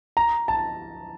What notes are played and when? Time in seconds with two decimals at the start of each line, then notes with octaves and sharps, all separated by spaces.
0.17 A#5
0.48 A5